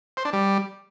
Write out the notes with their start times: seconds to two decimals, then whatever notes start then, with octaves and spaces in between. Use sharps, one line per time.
0.17 C5
0.25 D4
0.33 G3